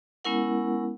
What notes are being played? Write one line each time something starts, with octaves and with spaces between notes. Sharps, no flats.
G#3 B3 C#4 E4 A#4 F#5